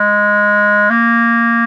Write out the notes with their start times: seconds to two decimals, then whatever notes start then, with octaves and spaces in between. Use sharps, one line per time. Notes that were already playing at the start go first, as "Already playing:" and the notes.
Already playing: G#3
0.90 A#3